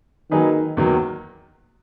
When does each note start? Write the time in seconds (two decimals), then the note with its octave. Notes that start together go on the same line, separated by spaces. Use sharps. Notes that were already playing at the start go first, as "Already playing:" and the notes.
0.31 D#3 F#3 A#3 D#4 G#4 B4
0.77 E2 D#3 F#3 A#3